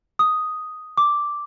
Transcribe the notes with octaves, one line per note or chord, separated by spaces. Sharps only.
D#6
D6